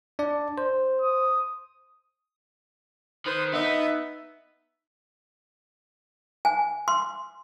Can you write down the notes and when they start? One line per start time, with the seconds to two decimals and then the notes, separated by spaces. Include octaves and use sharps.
0.19 D4 D5
0.58 C5
1.02 D#6
3.26 D#3 B4 C5 D#6
3.54 B3 D#4 E5
6.45 G#5
6.88 C6